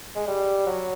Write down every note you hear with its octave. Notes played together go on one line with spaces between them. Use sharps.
G#3
G3
F#3